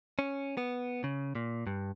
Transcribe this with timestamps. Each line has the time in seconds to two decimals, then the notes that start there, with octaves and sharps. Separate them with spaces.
0.19 C#4
0.57 B3
1.04 C#3
1.35 A#2
1.67 G2